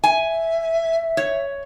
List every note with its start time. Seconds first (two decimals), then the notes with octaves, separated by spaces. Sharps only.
0.04 E5 G#5
1.17 C#5